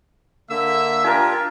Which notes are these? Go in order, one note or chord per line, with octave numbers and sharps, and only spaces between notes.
D3 A#3 E5 E6
D4 F4 G4 A#4 G#5